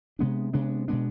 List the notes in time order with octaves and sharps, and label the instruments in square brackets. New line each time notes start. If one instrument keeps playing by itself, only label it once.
[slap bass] C3 G#3 B3 D4
C3 G#3 B3 D4
B2 G#3 B3 D4